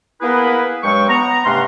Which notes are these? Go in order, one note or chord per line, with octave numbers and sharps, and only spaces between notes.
A#3 B3 E4 G#4 B4
G2 F#3 G#3 G5 C#6
B3 A#5
G2 C3 A3 C#4 F#5 C6